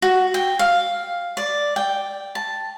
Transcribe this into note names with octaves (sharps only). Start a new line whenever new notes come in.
F#4
G5
F5
D5
G5
A5